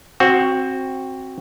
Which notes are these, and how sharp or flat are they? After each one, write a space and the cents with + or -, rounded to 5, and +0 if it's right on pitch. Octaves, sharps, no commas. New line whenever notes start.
C4 +15 F#4 +0